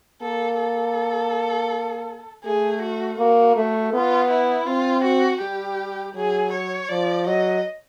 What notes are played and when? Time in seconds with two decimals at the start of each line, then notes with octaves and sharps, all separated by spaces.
0.22 A#3 A4
0.60 A4
2.45 A3 G#4
2.82 F#4
3.19 A#3 F#4
3.56 A3
3.93 B3 F4
4.31 E4
4.67 C4 F4
5.04 F#4
5.42 G3 G4
6.15 F#3 G#4
6.53 C#5
6.89 F3 D5
7.27 F#3 D#5